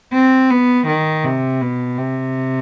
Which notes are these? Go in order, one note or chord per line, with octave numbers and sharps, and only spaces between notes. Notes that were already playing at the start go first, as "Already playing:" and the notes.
C4
B3
D#3
C3
B2
C3